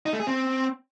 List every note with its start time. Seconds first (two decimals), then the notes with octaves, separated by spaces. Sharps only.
0.06 D#4
0.13 A3
0.20 G#4
0.27 C4